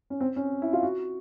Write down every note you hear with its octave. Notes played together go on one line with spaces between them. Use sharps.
C#4
C4
C#4
E4
F4
F#4